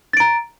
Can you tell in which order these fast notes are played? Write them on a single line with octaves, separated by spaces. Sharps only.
A6 D7 A#5